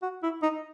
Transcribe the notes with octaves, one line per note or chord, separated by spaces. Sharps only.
F#4
E4
D#4